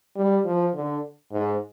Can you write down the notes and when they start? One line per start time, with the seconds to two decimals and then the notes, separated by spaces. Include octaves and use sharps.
0.16 G3
0.45 F3
0.74 D3
1.32 G#2